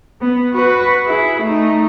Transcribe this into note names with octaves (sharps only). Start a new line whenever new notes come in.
B3
F#4 B4
E4 G#4
A3 D#4